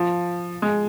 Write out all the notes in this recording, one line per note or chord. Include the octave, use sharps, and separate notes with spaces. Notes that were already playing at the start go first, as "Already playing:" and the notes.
Already playing: F3
G#3